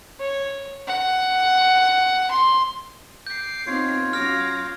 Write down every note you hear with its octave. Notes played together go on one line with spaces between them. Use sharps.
C#5
F#5
C6
D6 G6 C7
B3 C4 D#4 F4 C#5
F#3 C#4 F5 D6 F6 A#6